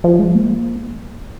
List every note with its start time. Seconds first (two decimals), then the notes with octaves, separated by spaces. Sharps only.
0.04 F3
0.19 G#3
0.34 A#3